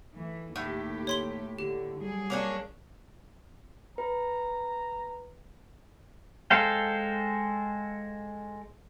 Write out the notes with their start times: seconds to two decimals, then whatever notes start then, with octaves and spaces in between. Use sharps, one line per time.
0.15 E3 A3
0.56 D#2 A2 A3 G4
1.07 C#5 C6 G7
1.59 D3 G4
1.99 F#3 G3 G#4
2.30 A#3 C#4 D4
3.98 B4 A#5
6.50 G#3 A4 C5 F5 G5